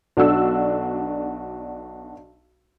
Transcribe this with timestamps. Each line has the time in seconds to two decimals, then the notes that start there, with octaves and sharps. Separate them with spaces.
0.17 B1 D4 F#4 A4 E6